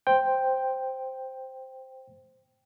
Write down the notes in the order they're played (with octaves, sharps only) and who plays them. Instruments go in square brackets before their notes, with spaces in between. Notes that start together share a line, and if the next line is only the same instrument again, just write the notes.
[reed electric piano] C5 G5